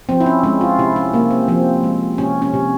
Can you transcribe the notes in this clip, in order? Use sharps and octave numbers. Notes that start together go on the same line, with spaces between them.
F3 C4
E4
C#4
G#3 C#4
F4
C3 E4
C#4
C3 A#3
C4
F3 C4
G#3
C3 C#4
C#4
C3